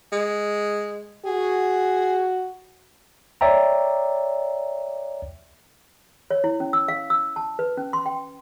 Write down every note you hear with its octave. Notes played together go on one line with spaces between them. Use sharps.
G#3
F#4 G#4
C#5 D5 E5 G5 A#5
C#5
E4
C#4
E6
F5
E6
A5
B4
C#4
C6
G5